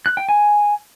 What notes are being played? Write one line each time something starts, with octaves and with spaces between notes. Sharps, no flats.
F#6
G5
G#5